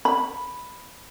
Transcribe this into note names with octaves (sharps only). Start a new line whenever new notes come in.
B5